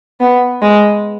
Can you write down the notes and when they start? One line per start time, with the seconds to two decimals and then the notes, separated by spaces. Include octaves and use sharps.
0.20 B3
0.62 G#3